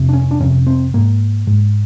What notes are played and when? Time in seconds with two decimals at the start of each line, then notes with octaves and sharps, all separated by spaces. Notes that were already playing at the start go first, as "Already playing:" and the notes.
Already playing: F2 C3
0.09 D4
0.13 C#4
0.31 D4
0.40 F2 C3 C#4
0.67 C4
0.94 G#2 A#3
1.47 G#2